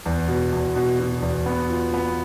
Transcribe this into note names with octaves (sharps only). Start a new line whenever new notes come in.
E2
B2
E2
B2
B2
E2
B3
F4
B3